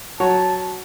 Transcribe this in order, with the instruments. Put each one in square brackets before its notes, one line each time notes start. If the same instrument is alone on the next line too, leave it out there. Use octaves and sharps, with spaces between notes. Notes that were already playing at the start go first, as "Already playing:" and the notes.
[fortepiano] F#3 F#4 C#5 [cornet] A5